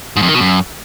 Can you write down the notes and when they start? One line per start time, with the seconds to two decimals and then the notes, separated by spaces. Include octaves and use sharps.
0.16 G#2
0.22 F2
0.28 D#3
0.34 B2
0.40 F#2